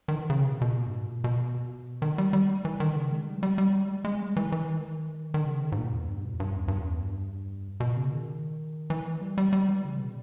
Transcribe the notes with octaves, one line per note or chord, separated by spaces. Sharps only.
D#3
E3
C#3
B2
B2
A#2
G2
G#2
A#2
B2
D#3
G3
G3
E3
D#3
C#3
G#3
G3
E3
G3
G3
G#3
G#3
G3
E3
E3
D#3
D#3
C#3
G#2
A#2
E2
G2
B2
E2
G2
E2
G2
E2
G2
B2
C#3
D#3
E3
G3
G3
G3
E3
C#3
B2